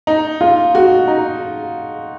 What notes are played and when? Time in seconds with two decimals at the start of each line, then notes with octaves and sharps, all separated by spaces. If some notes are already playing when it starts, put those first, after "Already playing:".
0.07 D#4
0.41 F4
0.75 F#4
1.08 D#4